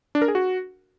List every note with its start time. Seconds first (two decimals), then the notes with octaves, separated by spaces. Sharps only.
0.15 D4
0.22 A#4
0.28 G#4
0.35 F#4